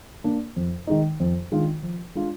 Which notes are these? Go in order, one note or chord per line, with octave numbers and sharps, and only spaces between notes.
A#3 D4
F2
D#3 G#3 D#4
F2
D#3 G#3 D4 F4
F3
G#3 D4 F4